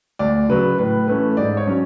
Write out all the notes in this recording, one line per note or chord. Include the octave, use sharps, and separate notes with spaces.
D2 D5
C#3 F#3 B4
A2 B4
E3 A3 C#4 B4
G#2 D5
C#5
F#3 C#4